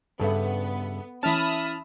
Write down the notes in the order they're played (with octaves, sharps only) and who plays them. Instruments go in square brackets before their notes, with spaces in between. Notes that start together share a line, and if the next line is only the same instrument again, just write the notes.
[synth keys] G2 C#3 [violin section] B3 [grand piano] A4 E5
[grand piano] E3 C#4 [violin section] E5 B5 D#6 [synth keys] A5 F6